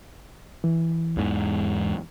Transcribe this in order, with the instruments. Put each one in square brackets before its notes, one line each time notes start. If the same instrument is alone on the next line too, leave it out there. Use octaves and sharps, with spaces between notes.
[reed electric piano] E3
[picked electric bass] E2 G#2